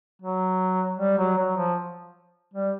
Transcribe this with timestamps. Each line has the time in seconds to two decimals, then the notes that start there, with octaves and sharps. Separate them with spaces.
0.22 F#3
0.98 G3
1.18 F#3
1.38 F#3
1.57 F3
2.54 G3